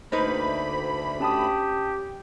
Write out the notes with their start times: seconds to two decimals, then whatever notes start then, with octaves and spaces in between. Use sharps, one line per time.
0.12 D2 A#3 D#4 B4 C5 B5
1.20 C#4 G4 A5 D#6